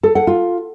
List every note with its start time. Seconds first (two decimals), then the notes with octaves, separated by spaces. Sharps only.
0.03 A4
0.15 F#5
0.27 F4